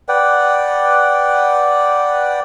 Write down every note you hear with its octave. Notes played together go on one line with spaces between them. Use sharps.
B4 D5 F#5 G5